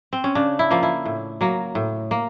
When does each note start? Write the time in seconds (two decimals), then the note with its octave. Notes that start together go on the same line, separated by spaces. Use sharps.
0.13 C4
0.24 C#4
0.35 C#3 D4
0.59 E4
0.71 F3 A#3
0.83 E4
1.06 A2
1.41 F#3 A#3
1.75 A2
2.11 A#3